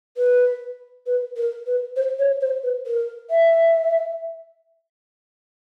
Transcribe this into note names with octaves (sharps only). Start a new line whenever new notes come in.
B4
B4
A#4
B4
C5
C#5
C5
B4
A#4
E5